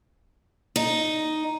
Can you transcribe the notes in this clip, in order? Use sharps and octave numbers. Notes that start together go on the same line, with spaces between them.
D#4